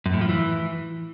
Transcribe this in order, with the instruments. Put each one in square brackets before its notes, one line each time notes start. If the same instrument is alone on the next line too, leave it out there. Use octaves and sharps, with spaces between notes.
[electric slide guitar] F#2
A2
F3
E3